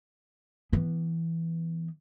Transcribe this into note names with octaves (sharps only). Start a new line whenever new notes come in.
E3 B3